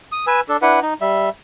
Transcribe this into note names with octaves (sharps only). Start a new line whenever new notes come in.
D#6
B4 G#5 E6
D4 A4
D4 E4 B4 F#5
D#4
G3 E5